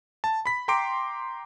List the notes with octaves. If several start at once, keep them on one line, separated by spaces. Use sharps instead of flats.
A5
B5 B6
G5 A#5 C6 D6 D7